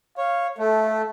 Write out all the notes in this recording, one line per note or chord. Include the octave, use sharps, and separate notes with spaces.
C#5 F5
A3 A4